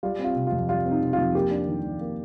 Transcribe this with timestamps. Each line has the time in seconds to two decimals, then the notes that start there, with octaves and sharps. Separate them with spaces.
0.03 G3 F4
0.19 C4
0.24 F4
0.36 C3
0.47 F4
0.52 F2
0.69 G3 F4
0.85 C4
0.91 D#4
1.02 C3
1.13 F4
1.18 F2
1.35 A#3 G4
1.51 D4
1.68 D#3
1.84 F2
2.01 A#3